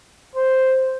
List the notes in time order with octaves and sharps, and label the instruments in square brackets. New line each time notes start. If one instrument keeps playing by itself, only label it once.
[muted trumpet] C5